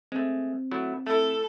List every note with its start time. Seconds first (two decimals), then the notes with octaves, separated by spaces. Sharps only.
0.12 G#3 A3 C4
0.71 F#3 A3 E4
1.07 A3 E4 A4